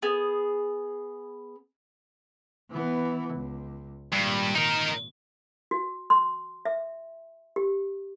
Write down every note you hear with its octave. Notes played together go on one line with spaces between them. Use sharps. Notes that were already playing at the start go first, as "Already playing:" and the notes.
B3 G#4
E3 B3
C#2
G#1 G2 A#2
D#4 A#4
F#4
C6
E5
G4